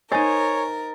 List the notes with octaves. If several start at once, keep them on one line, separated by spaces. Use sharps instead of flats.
D#4 A#4 C5 C#5 G#5 A6